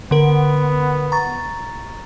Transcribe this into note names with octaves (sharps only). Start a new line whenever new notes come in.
D3 B3 A#4
A#5 C#6 A6